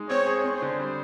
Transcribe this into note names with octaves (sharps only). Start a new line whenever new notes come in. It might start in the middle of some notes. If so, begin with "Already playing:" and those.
Already playing: G#3 D#4
C4 C#5
G#4
C4 C5
D3
G3